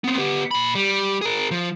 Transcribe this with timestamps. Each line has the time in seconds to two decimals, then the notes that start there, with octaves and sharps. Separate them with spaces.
0.04 B3 C4
0.18 B3 G4
0.51 A#2 B5
0.75 G3
1.21 G#4 A#4
1.51 F3